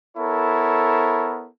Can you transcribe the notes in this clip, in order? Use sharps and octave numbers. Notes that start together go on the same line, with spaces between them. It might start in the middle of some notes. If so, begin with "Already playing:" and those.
B3 E4 A4 A#4 C#5